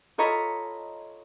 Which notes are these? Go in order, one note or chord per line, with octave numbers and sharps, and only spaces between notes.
F4 A4 C#5 D#5 A#5 B5